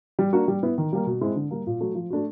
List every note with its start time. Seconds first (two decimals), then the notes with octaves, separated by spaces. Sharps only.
0.19 G3
0.33 A#3 D4 F#4
0.48 G3
0.63 B3 E4
0.78 D#3
0.93 G3 A#3
1.07 B2
1.21 G#3 C4 E4
1.36 D3
1.51 G3 A#3
1.67 A#2
1.81 F#3 A3
1.95 F3
2.10 A3 D4 F#4